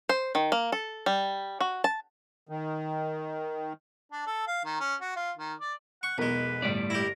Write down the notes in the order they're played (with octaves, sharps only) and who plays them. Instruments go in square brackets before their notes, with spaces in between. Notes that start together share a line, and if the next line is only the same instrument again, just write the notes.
[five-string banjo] C5
D#3
A#3
A4
G3
F#4
A5
[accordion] D#3
[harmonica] D4
A4
F5
D#3
C#4
F#4
F4
D#3
D5
[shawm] F#5 [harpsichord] C#6
[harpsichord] B1 G#3 [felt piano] E2 A#4 [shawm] B4
[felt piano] G1 B6 [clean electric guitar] A2 G3 D5
[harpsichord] E4 G4 [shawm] A#4